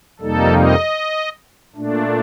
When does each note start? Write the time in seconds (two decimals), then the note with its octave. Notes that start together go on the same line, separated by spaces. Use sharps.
0.20 F2 C3 G3 A#3 D#4 A4
0.59 D#5
1.75 A#2 A3 D4